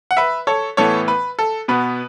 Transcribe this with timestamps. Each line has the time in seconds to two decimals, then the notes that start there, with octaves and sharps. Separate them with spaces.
0.11 F#5
0.17 B4 E5
0.47 A4 C#5
0.77 A2 E3 B3 A4 C#5
1.08 B4
1.39 A4
1.68 B2 B3 B4